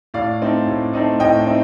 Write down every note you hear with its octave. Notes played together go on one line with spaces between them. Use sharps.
A2 D5 F5
A3 C4 D#4
A2
A3 C4 D#4
A2 D#5 G5
A3 C4 D#4